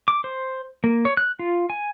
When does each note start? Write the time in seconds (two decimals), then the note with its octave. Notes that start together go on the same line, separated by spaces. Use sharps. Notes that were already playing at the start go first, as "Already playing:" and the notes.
0.08 D6
0.24 C5
0.84 A#3
1.05 C#5
1.17 F#6
1.39 F4
1.70 G#5